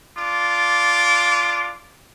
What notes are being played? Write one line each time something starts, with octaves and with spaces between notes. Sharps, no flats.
D4 F4 D6